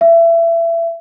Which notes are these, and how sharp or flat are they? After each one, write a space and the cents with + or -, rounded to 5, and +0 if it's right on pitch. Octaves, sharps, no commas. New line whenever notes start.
E5 +25